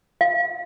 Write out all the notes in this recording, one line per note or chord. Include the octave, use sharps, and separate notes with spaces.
F5